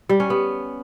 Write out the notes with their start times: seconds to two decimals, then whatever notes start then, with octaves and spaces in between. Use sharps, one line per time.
0.09 G3
0.20 C#4
0.30 B3